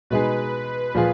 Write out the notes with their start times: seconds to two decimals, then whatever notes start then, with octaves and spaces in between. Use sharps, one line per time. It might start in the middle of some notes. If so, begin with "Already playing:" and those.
0.10 B2 G#3 D#4 G#4 B4
0.95 A#2 F3 A#3 F4 G#4